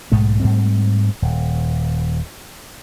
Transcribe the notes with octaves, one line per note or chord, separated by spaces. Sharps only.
B1 G#2 G#3 A3
G#2 G3 A3 C4
D#1